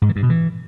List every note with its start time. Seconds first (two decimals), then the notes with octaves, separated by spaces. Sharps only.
0.02 G#2
0.09 E3
0.16 G2
0.23 B2
0.30 E3